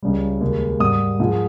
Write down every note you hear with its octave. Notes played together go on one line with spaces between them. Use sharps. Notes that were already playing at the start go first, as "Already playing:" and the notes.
C#2 C#3 G3
D#2 C#3 G#3
G#2 G3 D#6
G#2 F3 G#3